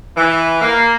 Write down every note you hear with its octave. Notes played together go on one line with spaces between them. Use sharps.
E3
A#3